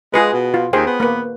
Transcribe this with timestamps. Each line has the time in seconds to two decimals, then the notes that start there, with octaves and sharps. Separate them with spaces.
0.14 G#3 F4 G#4 B4
0.33 B2
0.54 F4
0.73 D#2 G#4 C5 G5
0.86 B3
1.00 A#3 B4